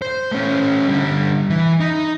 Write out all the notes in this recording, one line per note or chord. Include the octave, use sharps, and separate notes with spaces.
C5
A3 C#4
D3 G3
E3
D#4